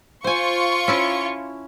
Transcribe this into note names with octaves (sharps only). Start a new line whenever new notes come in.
F4 C5 G#5 C#6
C#4 E4 A5